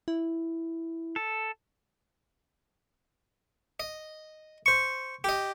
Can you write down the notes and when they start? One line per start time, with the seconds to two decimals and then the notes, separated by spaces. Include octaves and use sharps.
0.08 E4
1.16 A4
3.80 D#5
4.66 C5 C#6
5.24 G4 D#5